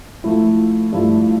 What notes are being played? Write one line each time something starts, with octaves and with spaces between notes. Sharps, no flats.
F3 A3 E4
G2 F3 A3 E4